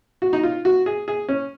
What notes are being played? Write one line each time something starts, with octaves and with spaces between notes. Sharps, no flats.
F#4
D#4
F4
F#4
G#4
G#4
C#4